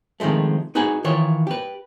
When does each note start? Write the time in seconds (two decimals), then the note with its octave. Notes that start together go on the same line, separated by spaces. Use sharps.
0.20 C3 D#3 F3 G#3 A3
0.75 D#4 F#4 G#4 B4 G#5
1.04 D#3 E3 F4 C#5
1.47 G4 B4